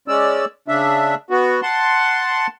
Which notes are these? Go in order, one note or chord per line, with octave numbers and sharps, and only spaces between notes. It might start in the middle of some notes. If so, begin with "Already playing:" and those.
G#3 C#4 D5 E6
C#3 D4 E5
B3 F#4
F#5 A5 C6